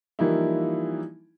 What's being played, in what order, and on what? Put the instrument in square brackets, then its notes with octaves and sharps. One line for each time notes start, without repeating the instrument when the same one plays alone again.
[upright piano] E3 F3 G3 A#3 D#4 E4